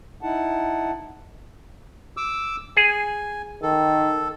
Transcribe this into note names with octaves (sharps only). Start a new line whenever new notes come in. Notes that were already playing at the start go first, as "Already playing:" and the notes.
D#4 E4 F#5 A5
D6 E6
G#4 G#5
D#3 A4